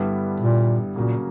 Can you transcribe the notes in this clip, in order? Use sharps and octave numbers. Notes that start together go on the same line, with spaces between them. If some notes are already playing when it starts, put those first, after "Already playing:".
Already playing: G2 D3 G3 B3 E4
A#2
A#2 C#3 F#3 A#3